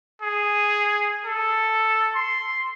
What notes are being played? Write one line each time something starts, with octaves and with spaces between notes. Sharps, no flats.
G#4
A4
C6